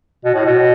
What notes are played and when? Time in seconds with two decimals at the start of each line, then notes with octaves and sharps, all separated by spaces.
0.25 B2
0.34 A2
0.45 B2